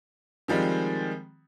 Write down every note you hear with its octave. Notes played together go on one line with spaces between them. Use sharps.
D#3 F3 G3 G#3 C4